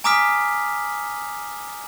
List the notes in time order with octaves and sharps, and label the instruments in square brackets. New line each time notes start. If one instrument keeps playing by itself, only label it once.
[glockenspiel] G#5 A#5 D6 D#6 F6 B6